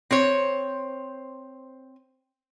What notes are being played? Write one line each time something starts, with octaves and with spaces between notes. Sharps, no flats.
C4 C5 C#5